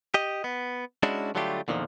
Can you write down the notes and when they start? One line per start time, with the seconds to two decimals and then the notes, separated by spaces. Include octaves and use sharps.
0.14 G4 D#5
0.44 B3
1.03 G#3 C#4 D4 E4 F#4
1.35 D3 F#3 G3 A3 F4 G4
1.68 E2 A#2 D3 D#3 F3